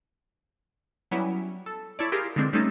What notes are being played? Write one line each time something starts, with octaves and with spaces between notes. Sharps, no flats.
F#3 G3 B3 C#4 E4
A4
E4 A4 C#5 D5
E4 F4 G4 G#4 A#4 F5
D3 E3 G#3 C4 D4
G3 A3 C4 C#4 D#4 A4